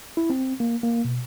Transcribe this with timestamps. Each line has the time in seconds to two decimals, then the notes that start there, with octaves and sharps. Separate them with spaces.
0.17 E4
0.30 C4
0.60 A#3
0.83 A#3
1.04 B2